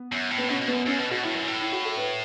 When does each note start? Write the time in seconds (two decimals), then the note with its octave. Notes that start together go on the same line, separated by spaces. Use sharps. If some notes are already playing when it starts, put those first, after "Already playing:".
Already playing: B3
0.12 F#2
0.31 A2
0.38 B3
0.49 B2 C#4
0.61 B2
0.68 B3
0.74 F#2
0.86 F#2 C#4
0.98 B2 B4
1.11 B2 F#4
1.23 A2 E4
1.35 F#2
1.48 A2
1.60 E4
1.72 F#4
1.85 A4
1.97 B4